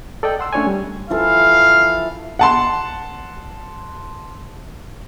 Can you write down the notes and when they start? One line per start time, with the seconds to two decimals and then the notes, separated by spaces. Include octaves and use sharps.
0.23 A4 D5 D#5 G5
0.39 F#5 C6 E6
0.53 A3 C#4 D4 C#5 D5 G#5
0.67 G3
1.10 E3 F3 A4 F5
2.39 F#5 A5 C6